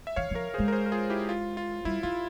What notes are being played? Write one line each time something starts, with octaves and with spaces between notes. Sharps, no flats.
E5
E3 C#5 F5
F3 A#4 C#5
G#3 G#4 C5
A#4
G#4 C5
A#4
F4 G#4
E4 G4
F4
F4
G3 E4
F3 F4